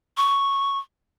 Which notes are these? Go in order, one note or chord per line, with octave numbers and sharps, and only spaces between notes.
C#6